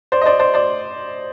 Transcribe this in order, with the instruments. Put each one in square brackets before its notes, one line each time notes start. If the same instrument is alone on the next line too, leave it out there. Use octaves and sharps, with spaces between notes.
[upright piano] C5 D5
D#5
C5 D5
C5 D5
C5 D5